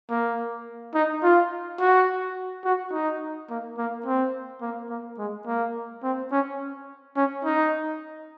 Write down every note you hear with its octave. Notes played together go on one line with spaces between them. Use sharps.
A#3
D#4
F4
F#4
F#4
D#4
A#3
A#3
C4
A#3
A#3
G#3
A#3
C4
C#4
C#4
D#4